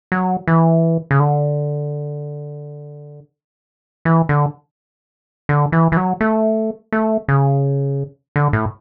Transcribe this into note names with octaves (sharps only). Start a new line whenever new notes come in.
F#3
E3
C#3
D3
E3
D3
D3
E3
E3
F#3
A3
A3
C#3
D3
A2